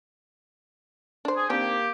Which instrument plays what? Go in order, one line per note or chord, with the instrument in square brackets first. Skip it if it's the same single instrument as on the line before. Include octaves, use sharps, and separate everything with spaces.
[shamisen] D4 C5
[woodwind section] G#4
[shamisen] D#3 C4 D4 [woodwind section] A#3 G4